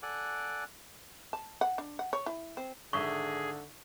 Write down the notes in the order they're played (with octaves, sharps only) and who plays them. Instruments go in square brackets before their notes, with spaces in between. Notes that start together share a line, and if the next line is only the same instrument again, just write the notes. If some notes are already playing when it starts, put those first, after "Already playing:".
[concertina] A4 D5 F#5 G#5 D6 F#6
[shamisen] A5
F#5
D4
F#5
C#5
E4
C4
[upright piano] G#1 E5 D#6 [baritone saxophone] D3 [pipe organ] G#4 [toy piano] C#6